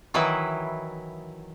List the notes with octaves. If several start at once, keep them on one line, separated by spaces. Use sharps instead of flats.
D#3 E3 F#3 E4 B4